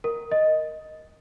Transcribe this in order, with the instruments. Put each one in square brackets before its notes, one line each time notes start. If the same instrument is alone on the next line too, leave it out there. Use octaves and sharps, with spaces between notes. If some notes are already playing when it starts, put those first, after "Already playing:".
[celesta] A#4
D#5